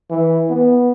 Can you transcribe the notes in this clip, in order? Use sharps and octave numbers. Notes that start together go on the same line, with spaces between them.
E3
B3